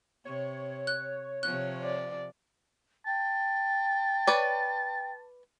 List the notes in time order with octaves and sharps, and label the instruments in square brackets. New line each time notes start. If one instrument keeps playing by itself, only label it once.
[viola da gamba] C3 [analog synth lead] C#5
[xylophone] F#6
[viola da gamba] C3 F3 [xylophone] F#6
[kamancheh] D5
[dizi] G5 [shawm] A5
[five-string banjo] B4 C#5 D5